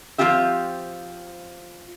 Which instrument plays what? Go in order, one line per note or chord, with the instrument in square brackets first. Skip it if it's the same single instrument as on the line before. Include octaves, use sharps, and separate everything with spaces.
[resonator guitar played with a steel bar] F3 F#3 C4 F4 G4 E5